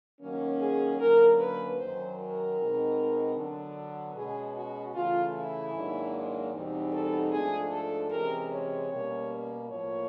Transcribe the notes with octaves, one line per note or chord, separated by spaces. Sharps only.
D#3 F#3 A#3 C#4
G#4
D3 F#3 A#3 C#4 A#4
B4
F#2 D#3 F#3 C5
A#4
B2 G#3 C4 D#4
D3 F#3 B3 D4
B2 G#3 C#4 G#4
F#4
C#3 E3 A3 F4
E4
G#2 D#3 F#3 A#3 D4
E2 B2 G3 C4 D#4
A4
G#2 F3 A3 D4 G#4
A4
C3 E3 G#3 C#4 A#4
C#5
B2 G3 A#3 C#4
A2 F3 A#3 C#5